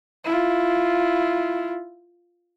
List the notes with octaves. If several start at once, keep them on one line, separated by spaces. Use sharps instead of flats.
E4 F4